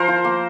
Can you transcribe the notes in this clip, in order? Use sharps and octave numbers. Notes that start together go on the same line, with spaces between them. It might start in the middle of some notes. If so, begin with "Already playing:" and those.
Already playing: F3 A#4 C5
F4
A#3